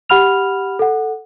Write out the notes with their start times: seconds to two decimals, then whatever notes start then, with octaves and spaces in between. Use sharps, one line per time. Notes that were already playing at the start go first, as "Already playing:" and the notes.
0.10 G4 F#5 B5 F6 F7
0.79 A4 F#5